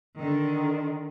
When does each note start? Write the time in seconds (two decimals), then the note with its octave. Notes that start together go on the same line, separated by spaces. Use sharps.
0.16 D3 D#3